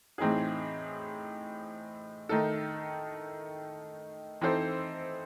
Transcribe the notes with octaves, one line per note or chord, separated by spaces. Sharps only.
A2 E3 C4 D#4 G#4
D#3 A3 D#4 A4
E3 C4 D#4 A4 C5